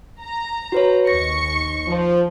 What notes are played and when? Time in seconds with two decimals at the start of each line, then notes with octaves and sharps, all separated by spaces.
0.20 A#5
0.72 F#4 B4 C#5
1.07 D#2 C#6 A#6 C#7
1.87 F3